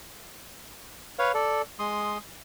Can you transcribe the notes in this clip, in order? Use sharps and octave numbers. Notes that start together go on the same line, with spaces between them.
B4 C#5 F5
A4 D5
G#3 C6 D#6